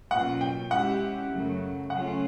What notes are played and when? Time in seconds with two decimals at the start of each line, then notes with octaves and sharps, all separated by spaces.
0.11 B2 F#3 A#3 C#4 F4 F#5
0.41 G5
0.71 G#3 C#4 E4 G4 F#5
1.31 F#2 C#3 F#3 A3
1.90 C#3 F#3 A3 C#4 F4 F#5